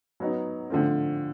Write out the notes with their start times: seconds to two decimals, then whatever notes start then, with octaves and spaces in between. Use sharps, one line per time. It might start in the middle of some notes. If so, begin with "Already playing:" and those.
0.20 F#3 B3 D#4
0.70 D3 F3 A3 C4